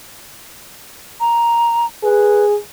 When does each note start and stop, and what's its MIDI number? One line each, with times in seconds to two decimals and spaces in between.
1.20 1.86 82
2.03 2.55 68
2.03 2.45 71